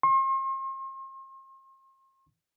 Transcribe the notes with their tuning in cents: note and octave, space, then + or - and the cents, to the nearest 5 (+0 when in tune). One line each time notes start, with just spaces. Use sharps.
C6 +45